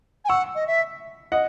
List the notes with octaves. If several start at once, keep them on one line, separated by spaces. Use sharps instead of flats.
G#5
F#5 C#6 E6
D#5
E5
D#5 F#5